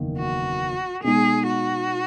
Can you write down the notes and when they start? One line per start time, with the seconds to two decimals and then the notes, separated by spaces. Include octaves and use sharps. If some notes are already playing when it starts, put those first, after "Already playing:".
Already playing: F#1 E2 D#3 A#3
0.18 F#4
1.04 B2 G#3 D#4 G#4
1.47 F#4